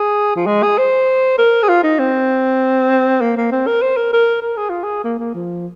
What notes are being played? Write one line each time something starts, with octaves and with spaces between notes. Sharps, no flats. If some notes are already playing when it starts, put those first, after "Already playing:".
Already playing: G#4
F3
G#3
G#4
C5
A#4
G#4
F4
D#4
C4
A#3
A#3
C4
A#4
C5
A#4
A#4
A#4
G#4
F4
G#4
A#3
A#3
F3